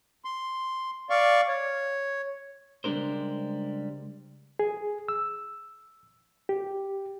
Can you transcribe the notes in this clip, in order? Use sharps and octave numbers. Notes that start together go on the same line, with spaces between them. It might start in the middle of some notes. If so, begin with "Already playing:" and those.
C6
D5 F5 C#6
C#5
C#2 G3 G#3 D4 A#4 C5
G#4
E6
G4